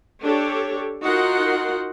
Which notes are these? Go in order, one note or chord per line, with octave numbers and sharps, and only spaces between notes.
D4 G4 A4 C#5
D#4 F4 F#4 A#4 F#5 C6